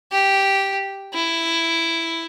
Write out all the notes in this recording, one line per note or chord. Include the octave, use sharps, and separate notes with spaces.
G4
E4